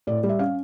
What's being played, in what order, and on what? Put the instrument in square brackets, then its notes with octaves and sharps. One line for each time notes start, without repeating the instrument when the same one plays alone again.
[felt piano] A2 D5
G3
E5
C#4 F5